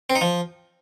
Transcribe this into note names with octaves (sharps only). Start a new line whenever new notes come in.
C4
D#4
F3